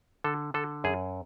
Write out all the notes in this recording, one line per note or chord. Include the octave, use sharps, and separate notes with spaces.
D3 A4
D3 A4
F#2 G#4